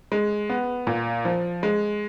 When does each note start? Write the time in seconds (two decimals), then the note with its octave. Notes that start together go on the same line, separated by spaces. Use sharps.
0.12 G#3
0.50 B3
0.87 A#2
1.25 F3
1.63 G#3